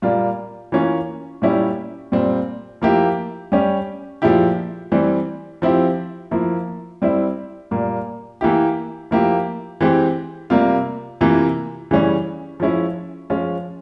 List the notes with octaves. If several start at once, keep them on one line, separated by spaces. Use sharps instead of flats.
A#2 G3 A#3 F4
E3 A#3 C#4 F4
A#2 G3 C#4 E4 G4
A#2 G3 C4
F3 A#3 E4 G4
G3 C#4 G4
A#2 F3 G#3 E4 G4
E3 G3 C4
F3 C4 E4 G4
F3 A#3 E4
G3 C4 E4
A#2 G3 A#3
E3 A#3 E4 G4
F3 A#3 E4 G4
E3 G#3 C4 G4
C3 G3 A#3 F4
C3 E3 A#3 F4
C#3 E3 G3 C#4
F3 G#3 C#4 E4
F3 G#3 C#4 F4